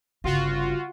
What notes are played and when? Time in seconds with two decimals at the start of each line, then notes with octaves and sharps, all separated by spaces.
0.24 G1 C#3 F4 F#4